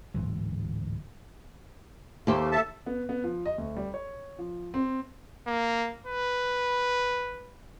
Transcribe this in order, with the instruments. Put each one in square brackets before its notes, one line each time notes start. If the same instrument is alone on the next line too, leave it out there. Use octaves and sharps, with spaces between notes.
[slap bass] D1 G#2 E3 F#3
[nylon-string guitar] D#2 G4 C5 [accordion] A3 A#3
[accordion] A4 E5 A5
[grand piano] B3
B3
F3
D#5
D2
G3
C#5
F3
C4
[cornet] A#3
B4